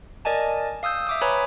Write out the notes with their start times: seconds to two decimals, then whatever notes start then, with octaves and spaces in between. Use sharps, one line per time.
0.25 A#4 D5 D#5 G#5 A5
0.83 F5 D#6 E6 G6
1.07 E5 D6 D#6
1.21 B4 C#5 G#5 A#5 B5